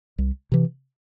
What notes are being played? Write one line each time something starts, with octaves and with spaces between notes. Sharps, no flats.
C2
C3 E3